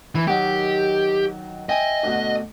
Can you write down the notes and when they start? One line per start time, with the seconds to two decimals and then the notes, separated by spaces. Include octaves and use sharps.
0.15 E3 E4
0.27 D#3 F#3 G4
1.69 D#5 E5 G5 G#5
2.04 D2 B2